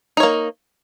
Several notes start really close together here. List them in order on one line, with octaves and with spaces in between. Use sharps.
D#4 C#5 A#3